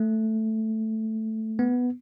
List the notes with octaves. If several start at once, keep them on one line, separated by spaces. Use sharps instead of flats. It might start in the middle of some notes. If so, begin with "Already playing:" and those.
Already playing: A3
B3